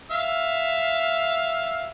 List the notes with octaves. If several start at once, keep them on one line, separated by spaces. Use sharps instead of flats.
E5 F5